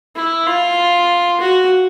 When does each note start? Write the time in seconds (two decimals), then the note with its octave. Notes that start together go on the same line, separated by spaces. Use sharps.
0.16 E4
0.47 F4
1.40 F#4